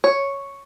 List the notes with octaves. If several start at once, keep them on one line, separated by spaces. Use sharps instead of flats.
C#5